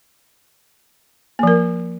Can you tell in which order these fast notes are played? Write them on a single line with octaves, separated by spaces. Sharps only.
A#3 F3 A#4